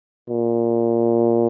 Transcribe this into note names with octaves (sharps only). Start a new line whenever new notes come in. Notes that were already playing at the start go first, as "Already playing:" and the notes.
A#2